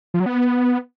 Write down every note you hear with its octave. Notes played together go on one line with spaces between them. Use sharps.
F3
F#3
B3